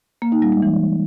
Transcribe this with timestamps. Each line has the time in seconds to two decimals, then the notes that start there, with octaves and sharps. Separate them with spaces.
0.22 A#3
0.32 D#4
0.42 G3
0.52 G#3
0.62 E3